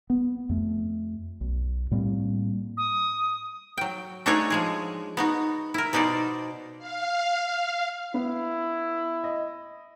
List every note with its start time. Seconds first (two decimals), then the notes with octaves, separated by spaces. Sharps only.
0.10 B3
0.49 F2 A3
1.41 B1
1.91 A2 G3 A#3 C4
2.77 D#6
3.77 F#3 G5
4.26 A3 D4 D#4 F#4 G#4 C#5
4.50 F3 G#3 G#4
5.17 B3 D#4 F#4
5.74 E4 A#4
5.93 B2 B3 D#4 C5 D5
6.78 F5
8.14 B3 E4
9.24 D#5